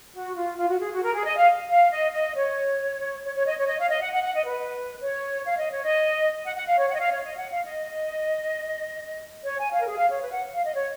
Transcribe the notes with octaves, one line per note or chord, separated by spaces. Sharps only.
F#4
F4
F4
F#4
G#4
F#4
A#4
G#4
D#5
F5
F5
D#5
D#5
C#5
C#5
C#5
D#5
C#5
D#5
F5
D#5
F#5
F#5
F#5
D#5
B4
C#5
F5
D#5
C#5
D#5
F#5
F#5
F5
C#5
F#5
D#5
F5
C#5
D#5
F#5
F5
D#5
C#5
G#5
F5
A#4
G#4
F5
C#5
B4
F#5
F5
D#5
C#5